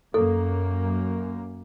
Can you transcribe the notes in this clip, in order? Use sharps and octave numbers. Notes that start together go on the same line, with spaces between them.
F#2 A#3 A4